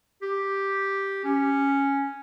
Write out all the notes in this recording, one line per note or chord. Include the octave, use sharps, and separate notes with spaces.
G4
C#4